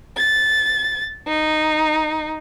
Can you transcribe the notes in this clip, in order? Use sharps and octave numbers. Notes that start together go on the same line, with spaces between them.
A6
D#4